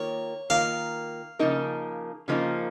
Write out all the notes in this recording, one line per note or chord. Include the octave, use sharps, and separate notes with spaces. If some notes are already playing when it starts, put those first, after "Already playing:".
Already playing: D#3 A#3 F4 A#4 C#5
D#3 A#3 F4 A#4 F5
C#3 F3 A#3 D#4 A#4
C#3 F3 A#3 D#4 A#4